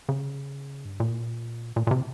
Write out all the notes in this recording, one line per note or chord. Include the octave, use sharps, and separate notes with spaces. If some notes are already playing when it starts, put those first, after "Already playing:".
C#3
G2
A#2
A#2
A#2
C3